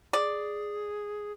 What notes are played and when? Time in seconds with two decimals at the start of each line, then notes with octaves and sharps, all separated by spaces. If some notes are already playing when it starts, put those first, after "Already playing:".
0.13 G#4 D5